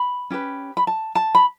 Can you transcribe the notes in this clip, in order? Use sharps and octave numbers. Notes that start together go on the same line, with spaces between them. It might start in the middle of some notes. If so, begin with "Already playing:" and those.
Already playing: B5
C#4 G4 B4
B5
A5
A5
B5